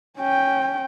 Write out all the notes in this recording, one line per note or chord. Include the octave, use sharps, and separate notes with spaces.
C#4 G5